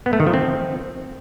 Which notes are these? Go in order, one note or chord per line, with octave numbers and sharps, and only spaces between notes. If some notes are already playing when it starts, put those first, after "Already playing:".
B3
A3
D#3
F3
C4